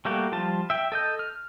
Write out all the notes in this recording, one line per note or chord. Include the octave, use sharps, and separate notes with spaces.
G3 A3 A#3 F#4 G4
F3 G3 F4 A5
E5 G5
A4 D#5 G6
F6